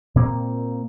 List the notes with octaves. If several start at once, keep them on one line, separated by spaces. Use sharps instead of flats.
A#2 A#3 C4